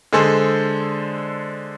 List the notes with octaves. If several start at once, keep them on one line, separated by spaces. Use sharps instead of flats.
D3 G#3 G#4 A4 C5